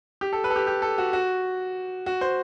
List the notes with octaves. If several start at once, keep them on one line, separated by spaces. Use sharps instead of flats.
G4
A4
B4
A4
G4
G4
A4
F#4
F#4
F#4
C5